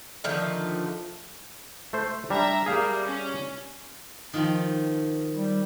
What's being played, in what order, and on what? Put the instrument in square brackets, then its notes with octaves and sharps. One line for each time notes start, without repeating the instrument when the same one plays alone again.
[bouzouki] D3 D#3 F3 A3
[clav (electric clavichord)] A3 C5
[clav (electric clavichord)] G3 D4 [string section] E5 A#5
[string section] G3 A#3 [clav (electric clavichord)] G#4 F5
[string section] C#4
[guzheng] D#3 F3 F4
[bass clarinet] G3